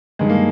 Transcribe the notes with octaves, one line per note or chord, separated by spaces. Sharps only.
G2 D#3 G#3
A#3